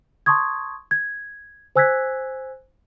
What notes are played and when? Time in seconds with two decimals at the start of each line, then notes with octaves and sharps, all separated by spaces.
0.26 A5 C6 C#6 D#6 G#6
0.91 G#6
1.76 C5 G#5 E6 F#6 G#6 B6